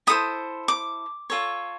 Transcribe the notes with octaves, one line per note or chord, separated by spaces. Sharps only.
E4 A4 C5 D#6
D6
F4 A4 C#5